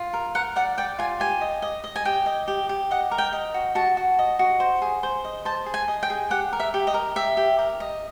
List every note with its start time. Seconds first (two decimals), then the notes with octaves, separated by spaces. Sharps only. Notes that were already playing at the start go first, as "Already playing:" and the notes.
Already playing: F4
0.13 A#4
0.35 A#4 F#5
0.56 D5 F#5
0.78 D5 G5
0.99 F4 G#5
1.20 G4 G#5
1.41 D#5
1.62 D#5
1.84 D#5
1.96 G#5
2.05 G4 G5
2.26 D#5
2.48 G4
2.69 G4
2.91 D#5 F#5
3.11 A#4
3.18 G5
3.33 D#5
3.54 F#4
3.75 F#4 A5
3.97 F#4
4.19 D#5
4.39 F#4
4.60 C5
4.82 G#4
5.03 C5
5.24 D#5
5.45 C5 A5
5.66 G#4
5.74 G#5
5.88 D#5
6.03 G5
6.10 G#4
6.30 G4 F#5
6.53 A#4
6.60 E5
6.74 G4
6.87 D#5
6.94 A#4
7.16 G4 E5
7.37 G4
7.59 A#4
7.80 D#5